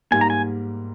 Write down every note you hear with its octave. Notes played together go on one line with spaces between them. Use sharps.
G#2 G3 A#3 G#5
A#5
G#5